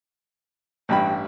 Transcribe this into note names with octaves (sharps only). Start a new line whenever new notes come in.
A1 G2 G5 B5